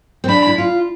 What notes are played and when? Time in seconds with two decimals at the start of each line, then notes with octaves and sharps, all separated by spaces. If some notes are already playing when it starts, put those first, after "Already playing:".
0.24 C4
0.28 D4 B5
0.47 E4
0.58 F4